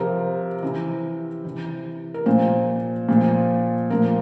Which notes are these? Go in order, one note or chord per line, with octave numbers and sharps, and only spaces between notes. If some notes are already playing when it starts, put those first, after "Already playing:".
Already playing: C3 F3 A#4
C3 E3
C3 E3
A#4
A#2 F3 C5
A#2 F3
A#2 F3 A#4